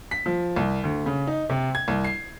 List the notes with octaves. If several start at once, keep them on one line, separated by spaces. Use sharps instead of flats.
B6
F3
C2
D2
C#3
D#4
C3
G#6
C2
C7